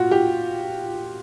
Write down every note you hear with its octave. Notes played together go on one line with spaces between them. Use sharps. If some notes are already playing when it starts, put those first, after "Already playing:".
Already playing: A#2 F4 F#4
G4